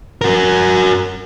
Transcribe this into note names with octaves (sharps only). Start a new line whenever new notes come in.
F#4 A#4